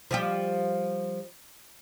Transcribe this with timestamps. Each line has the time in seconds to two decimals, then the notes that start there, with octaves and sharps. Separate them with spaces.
0.11 F3 G3 G4